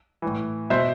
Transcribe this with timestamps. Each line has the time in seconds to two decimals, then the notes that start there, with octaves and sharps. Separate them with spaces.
0.22 A2 E3
0.70 B2 C5 E5